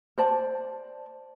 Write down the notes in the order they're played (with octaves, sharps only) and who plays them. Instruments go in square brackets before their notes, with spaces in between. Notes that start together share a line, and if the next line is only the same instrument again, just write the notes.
[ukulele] C5 D5 A5